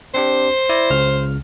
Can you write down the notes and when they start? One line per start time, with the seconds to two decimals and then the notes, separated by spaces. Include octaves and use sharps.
0.14 C4 D4 G4 C5
0.69 E4 D5 A#6
0.90 C#2 C#3 F6